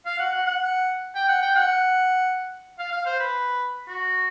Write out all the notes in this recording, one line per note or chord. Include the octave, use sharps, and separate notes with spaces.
F5
F#5
F#5
F#5
G5
F#5
G5
F#5
F5
F5
C5
B4
F#4